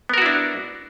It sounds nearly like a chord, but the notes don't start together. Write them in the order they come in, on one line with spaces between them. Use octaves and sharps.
B3 A#4 F#4 E4 D4